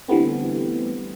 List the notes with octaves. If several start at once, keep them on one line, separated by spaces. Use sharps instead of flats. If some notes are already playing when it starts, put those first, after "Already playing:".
D3 E3 G3 A3 B3 C4